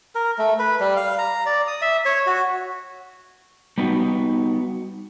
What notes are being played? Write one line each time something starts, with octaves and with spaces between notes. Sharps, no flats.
A#4
A3
B4
G3
F5
A#5
D5
D#6
E5
C#5
F#4
G3 B3 D#4 F#4